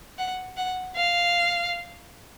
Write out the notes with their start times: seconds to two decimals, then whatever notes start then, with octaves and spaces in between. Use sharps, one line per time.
0.18 F#5
0.57 F#5
0.96 F5